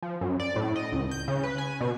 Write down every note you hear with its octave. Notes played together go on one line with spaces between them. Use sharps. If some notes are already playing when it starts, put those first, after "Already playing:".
F3
F#2
D5
A2
D#5
C#2
G6
C#3
B4
G#5
B2